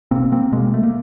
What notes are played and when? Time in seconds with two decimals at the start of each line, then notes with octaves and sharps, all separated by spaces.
0.11 B2 A#3 C4
0.32 A#3 C4
0.52 B2 G#3 A#3
0.74 A3
0.83 A#3